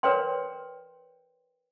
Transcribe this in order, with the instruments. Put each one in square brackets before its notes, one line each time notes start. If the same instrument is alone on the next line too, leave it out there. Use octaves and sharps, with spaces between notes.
[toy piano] A#4 B4 C#5 D5 G5 C6